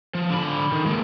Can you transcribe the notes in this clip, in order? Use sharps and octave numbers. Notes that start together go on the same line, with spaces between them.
F3
D3 B5
D#3
G#3 A#3